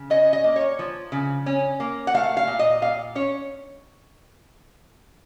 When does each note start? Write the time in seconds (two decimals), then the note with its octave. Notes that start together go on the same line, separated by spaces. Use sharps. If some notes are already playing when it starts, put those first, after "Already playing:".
Already playing: C#3
0.10 C#4 D#5
0.33 D#5
0.44 A#3
0.56 C#5
0.79 F3
1.12 C#3
1.46 C#4
1.80 A#3
2.07 F#5
2.14 A3 F5
2.37 F5
2.47 A#2
2.59 D#5
2.82 A#2 F5
3.15 C#4 C#5